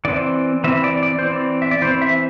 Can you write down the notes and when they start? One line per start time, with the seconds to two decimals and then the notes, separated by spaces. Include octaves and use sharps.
0.05 E3 C4 D5
0.64 E3 C4 E5
0.84 D5
1.03 D5
1.19 C5
1.23 E3 C4 D5
1.62 E5
1.71 D5
1.82 E3 C4 C5
2.02 E5